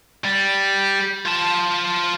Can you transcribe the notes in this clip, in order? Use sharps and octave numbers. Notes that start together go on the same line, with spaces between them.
G3
F4 A5